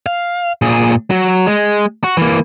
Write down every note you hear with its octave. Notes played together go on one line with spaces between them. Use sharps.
F5
A#2 G#4
F#3
G#3
F#4
E3 A#3